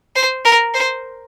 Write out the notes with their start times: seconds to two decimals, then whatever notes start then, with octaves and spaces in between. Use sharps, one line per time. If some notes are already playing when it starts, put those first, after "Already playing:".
0.16 C5
0.45 A#4
0.74 C5